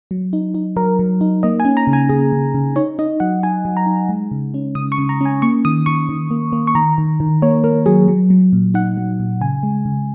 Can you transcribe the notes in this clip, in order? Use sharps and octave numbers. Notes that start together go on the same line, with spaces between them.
F#3
D#4
D#4
F#3 A#4
F#3
D#4
A#3 D#5
G#5
C#4
A#5
C#3
G#5
C#3 G#4
C#3
C#3
D#4 C#5
D#4 D#5
F#3 F#5
D#4 G#5
F#3
A#5
D#4
G#3
C#3
C#4
C#3 D#6
C#6
C#3
A#5
C#4 G#5
A#3 C#6
D#3 D#6
D#3 C#6
D#3
A#3
A#3
C#6
D#3 A#5
D#3
D#3
A#3 C#5
A#3 A#4
F#3 G#4
F#3
F#3
A#2
D#4 F#5
F#3
A#2
C#3 G#5
G#3
C#3